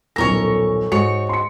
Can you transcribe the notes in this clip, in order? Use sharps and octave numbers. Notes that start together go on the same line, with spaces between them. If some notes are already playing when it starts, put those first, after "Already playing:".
D#1 B1 A4 A#4 C#5 A#6
G#2 F#4 C#5 C#7
C6 C#7